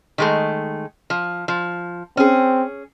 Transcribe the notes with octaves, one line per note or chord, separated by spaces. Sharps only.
D#3 G#3 A3
F3
F3
C4 C#4 G#4